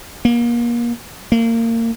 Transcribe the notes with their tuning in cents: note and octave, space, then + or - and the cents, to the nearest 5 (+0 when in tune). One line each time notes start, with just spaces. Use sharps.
A#3 +30
A#3 -30